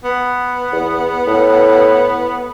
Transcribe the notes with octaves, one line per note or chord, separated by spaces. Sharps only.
B3
E2
A2